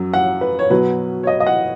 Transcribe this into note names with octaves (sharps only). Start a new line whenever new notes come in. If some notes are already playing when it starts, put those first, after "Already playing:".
Already playing: F#2 F#3
F#5
B4
C#5
B2 F#3 B4
C#5
D#5
D#5
F#5